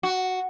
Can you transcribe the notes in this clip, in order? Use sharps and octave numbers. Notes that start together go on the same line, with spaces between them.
F#4